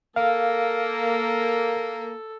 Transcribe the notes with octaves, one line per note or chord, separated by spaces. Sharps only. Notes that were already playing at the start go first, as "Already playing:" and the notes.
A#3 A4 F5